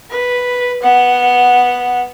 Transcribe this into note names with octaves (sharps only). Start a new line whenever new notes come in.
B4
B3 F#5